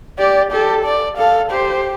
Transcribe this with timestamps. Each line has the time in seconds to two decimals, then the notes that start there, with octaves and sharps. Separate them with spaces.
0.19 G4 D5
0.51 G4 A4
0.85 D5
1.18 A4 F5
1.51 G4 C5